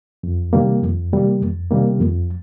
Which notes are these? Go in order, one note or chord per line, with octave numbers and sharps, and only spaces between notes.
F2
C3 D#3 G3 A#3
F2
C3 D#3 G3 A#3
F2
C3 D#3 G3 A#3
F2